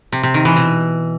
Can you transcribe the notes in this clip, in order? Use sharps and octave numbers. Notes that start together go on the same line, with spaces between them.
C3
C3
D#3
E3
B2